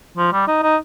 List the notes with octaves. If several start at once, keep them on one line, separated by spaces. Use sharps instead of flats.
F3
G3
D#4
D#4